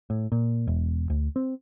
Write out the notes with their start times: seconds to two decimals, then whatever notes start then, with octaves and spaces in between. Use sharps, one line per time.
0.10 A2
0.32 A#2
0.67 E1
1.10 D2
1.36 C4